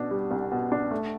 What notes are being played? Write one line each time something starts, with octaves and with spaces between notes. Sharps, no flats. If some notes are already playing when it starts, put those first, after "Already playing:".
Already playing: B2 D4
G3
C2
B2
D4
A3